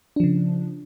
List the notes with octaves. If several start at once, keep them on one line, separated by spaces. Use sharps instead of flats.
C#3 F3 D4